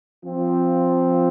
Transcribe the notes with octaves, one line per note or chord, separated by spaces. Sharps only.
F3 C4 F4